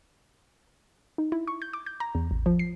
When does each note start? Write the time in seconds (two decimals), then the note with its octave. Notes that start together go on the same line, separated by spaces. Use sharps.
1.18 D#4
1.32 E4
1.47 C#6
1.62 G6
1.73 D6
1.86 G6
2.00 A#5
2.15 E2
2.31 A1
2.46 F3
2.59 C7